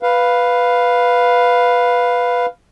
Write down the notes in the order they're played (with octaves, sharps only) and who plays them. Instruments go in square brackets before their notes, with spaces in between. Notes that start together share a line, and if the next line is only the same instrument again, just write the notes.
[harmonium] B4 F5